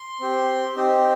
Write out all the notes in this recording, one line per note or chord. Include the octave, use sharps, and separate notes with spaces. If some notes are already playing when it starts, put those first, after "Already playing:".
Already playing: C6
C4 G4
C4 D#4 G4